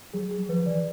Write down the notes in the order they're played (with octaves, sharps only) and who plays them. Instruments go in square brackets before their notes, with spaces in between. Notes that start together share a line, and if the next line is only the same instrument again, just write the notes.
[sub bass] F#3 [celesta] G#4
[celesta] G#4
[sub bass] F3 [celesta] B4
[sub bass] E3 [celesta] D5